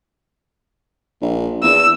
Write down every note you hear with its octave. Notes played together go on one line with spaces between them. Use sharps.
A#1
E2 E6